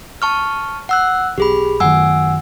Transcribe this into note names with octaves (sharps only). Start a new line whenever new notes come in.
A5 C#6 F6
F#5 E6 F#6
B1 G4 G#4 B5
F#2 D#3 F#5 G#5 E6